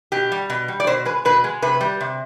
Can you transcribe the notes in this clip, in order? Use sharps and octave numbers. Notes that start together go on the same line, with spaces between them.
B2 G4
G3
B2
G3
D5
B2 C5
G#3 B4
B2 B4
G#3
C3 B4
G3
C3